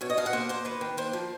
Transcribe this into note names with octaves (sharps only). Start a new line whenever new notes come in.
B2 C#5
D#5
B2 F5
F#5
A#3 C5
A#3 C5
D#3 B4
D#3
A#3 C5
F3